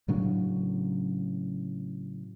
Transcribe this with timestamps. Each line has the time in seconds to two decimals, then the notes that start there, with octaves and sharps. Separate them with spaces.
0.08 A2 C#3 F#3 D4